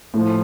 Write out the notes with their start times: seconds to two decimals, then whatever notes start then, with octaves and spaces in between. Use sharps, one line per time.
0.14 A2 F3